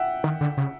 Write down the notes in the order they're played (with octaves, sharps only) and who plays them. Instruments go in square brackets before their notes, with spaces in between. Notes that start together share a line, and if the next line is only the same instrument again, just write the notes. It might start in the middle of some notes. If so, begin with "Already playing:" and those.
Already playing: [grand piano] E5 F#5 G5
[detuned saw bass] D#3
D3
C#3